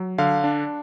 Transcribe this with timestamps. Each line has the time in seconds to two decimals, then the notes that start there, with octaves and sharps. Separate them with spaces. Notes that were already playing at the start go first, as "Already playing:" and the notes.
Already playing: F#3
0.18 D3 F5
0.44 D4